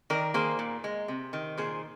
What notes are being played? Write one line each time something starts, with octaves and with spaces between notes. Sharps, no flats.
D#3 A#4 D5
A#3 G#4 C5
A#2
G#3
C3
D#3
A#2 G#4 C5